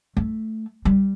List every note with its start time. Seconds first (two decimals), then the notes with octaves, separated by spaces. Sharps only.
0.17 A3
0.85 G3